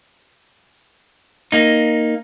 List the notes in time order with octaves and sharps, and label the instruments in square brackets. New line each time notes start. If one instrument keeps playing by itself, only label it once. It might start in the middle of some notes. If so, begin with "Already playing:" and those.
[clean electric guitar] A#3 D#4